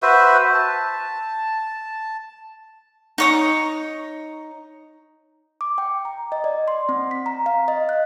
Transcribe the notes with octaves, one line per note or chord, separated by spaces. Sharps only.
F#4 B4 C5 E5
A5
D#4 C#5 D#6
D6
G5
A#5
D#5
D5
C6
C4
B6
A#5
F5
D#5
F#6